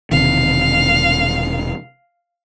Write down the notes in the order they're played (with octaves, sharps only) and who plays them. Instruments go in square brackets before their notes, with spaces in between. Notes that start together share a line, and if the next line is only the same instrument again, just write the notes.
[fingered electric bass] E1 C3 D#3 [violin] F5